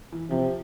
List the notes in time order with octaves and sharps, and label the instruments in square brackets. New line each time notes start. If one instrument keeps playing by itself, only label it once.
[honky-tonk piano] E3
[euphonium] C3 [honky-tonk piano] F3